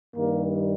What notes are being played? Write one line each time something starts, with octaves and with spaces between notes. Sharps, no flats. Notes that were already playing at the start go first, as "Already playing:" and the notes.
G2 D#3 G3 A#3